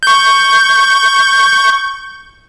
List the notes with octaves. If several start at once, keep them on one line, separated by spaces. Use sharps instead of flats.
C#6 G6